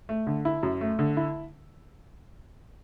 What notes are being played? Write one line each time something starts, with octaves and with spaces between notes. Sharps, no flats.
A3
D3
E4
F#2
A3
D3
E4